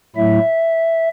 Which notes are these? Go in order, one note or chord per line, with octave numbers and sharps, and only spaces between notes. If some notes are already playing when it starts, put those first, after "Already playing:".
A2 F#3 A3 E4 E5